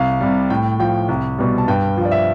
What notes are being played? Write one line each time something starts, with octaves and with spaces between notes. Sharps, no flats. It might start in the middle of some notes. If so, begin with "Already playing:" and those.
Already playing: C2 F5
C3 G3
A2 G5
F3 G5
C2
B2 G3
A5
G2 G5
F3
D5
E5